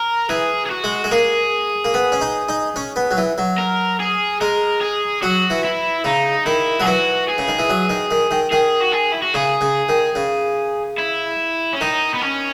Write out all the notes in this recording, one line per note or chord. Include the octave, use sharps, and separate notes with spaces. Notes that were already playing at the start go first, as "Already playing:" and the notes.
Already playing: A#4
E3 G#4
G#4
F#4
G#3
G#3
A#3 G#4
A#3
B3
C#4
D#4
D#4
C#4
B3
F#3
E3
F#3
A#4
G#4
G#3 A#4
G#4
F#3 F#4
E3
E4
C#3 D#4
D#3 E4
F#3 G#4
E3 F#4
G#4
C#3
D#3
E3
F#3
D#3
D#3
D#3
D#3 G#4
F#4
G#4
E4
F#4
C#3 G#4
C#3
D#3
C#3
E4
C#4
D#3 D#4
B3
C#4